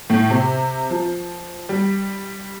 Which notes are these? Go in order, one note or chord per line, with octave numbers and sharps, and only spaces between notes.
A2
C3
F3
G3